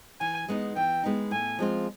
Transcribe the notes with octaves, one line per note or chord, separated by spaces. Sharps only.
E3 G#5
G#3 B3 D#4
E3 G5
G#3 B3 D#4
A2 G#5
F3 G#3 C4 F4